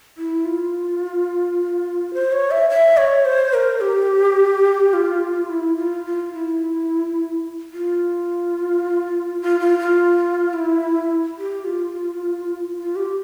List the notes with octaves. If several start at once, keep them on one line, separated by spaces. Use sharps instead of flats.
E4
F4
C5
C#5
E5
E5
C#5
C5
A#4
G4
F4
E4
F4
F4
E4
F4
F4
F4
F4
E4
G4
F4
F4
G4